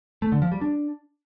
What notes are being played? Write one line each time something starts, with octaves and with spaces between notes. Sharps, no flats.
A3
D3
F3
G3
D4